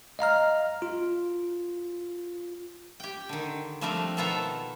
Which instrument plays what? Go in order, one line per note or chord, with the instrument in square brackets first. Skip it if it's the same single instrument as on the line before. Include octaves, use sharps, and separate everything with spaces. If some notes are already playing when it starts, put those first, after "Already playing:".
[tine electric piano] D#5 F5 A#5 F6
F4
[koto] G4 G5
D3 D#3
F3 G3 A3 C4 D4 A#4
B2 D#3 F4 A4 E5 A#5